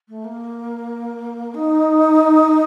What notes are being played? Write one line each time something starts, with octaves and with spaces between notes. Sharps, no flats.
A3
A#3
D#4